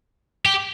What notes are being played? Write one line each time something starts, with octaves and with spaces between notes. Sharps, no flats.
G4